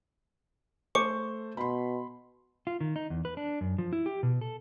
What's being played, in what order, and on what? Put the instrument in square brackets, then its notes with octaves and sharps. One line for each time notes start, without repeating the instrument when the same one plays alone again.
[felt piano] A3 C5 [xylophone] C#6 D6 C#7
[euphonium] B2 [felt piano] B5 C6
[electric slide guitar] F4
D#3
D#4
E2
B4
D4
F#2
F3
E4
G4
B2
A4